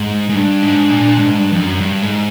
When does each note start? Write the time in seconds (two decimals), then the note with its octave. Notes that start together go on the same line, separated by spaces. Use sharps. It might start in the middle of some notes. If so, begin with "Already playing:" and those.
Already playing: G#2
0.29 G#2
0.34 G2 D4
0.62 G#2
0.90 A#2
1.19 G#2
1.39 G2
1.52 F2
1.60 F#2
1.81 G2
2.02 G#2